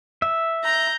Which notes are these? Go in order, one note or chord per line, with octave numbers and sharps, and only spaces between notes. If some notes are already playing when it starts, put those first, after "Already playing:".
E5
A#5 G6